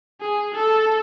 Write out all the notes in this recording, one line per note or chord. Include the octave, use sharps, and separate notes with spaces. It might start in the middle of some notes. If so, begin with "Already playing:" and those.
G#4
A4